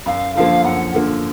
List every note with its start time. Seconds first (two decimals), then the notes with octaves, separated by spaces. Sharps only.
0.06 F#2 F5
0.35 D3 F3 A#3 F5
0.64 F#2 F#5
0.94 D3 F3 A#3